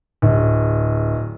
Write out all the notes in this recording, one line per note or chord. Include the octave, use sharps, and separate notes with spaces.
D1